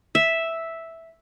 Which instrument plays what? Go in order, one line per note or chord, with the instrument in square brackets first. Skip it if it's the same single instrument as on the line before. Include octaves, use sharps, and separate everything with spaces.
[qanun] E5